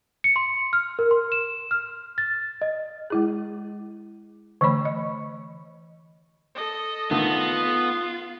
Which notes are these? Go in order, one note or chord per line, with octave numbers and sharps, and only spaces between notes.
C#7
C6
F6
A#4
C6
E7
F6
A6
D#5
G#3 E4 G#4
D3 E3 A3 C#5 B5
D#5
A4 D#5
D3 D#3 A3 B3 F4